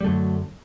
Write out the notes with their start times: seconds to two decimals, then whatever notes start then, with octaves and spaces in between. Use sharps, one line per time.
0.01 G3
0.04 F#2 D3 F#3 A3